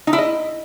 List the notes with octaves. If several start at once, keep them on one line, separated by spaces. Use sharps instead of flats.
D#4
E4
D#5